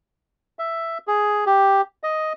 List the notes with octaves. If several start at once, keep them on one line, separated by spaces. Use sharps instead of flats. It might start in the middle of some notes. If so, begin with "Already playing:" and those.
E5
G#4
G4
D#5